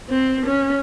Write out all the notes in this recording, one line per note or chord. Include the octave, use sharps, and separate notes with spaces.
C4
C#4